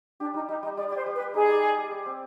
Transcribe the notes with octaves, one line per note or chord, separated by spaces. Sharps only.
D4 G4
G3 D#4
G3 D#4
G3 D#4
G3 D5
D5
G4 C5
G3
B4
G4
D#4 G#4
D5
D5
G4
D5
C4